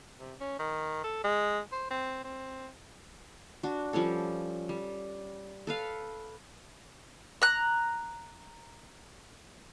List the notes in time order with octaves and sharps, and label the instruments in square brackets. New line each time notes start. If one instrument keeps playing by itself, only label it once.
[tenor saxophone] C3
C#4
D#3
A4
G#3
C5
C4
C4
[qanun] D4 F#4
F3 G3 C#4 A4
G3
A4 B4 F5
[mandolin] A#5 F#6